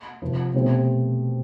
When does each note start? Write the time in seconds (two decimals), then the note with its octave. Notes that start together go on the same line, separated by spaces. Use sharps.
0.22 C3 F3 C4 F4
0.54 B2 A3 C4 G4